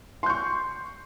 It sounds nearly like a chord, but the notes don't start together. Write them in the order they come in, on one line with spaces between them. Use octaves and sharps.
C6 G6 C#6